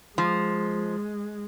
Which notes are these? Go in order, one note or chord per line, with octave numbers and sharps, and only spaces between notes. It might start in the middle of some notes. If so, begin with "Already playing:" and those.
F3 G#3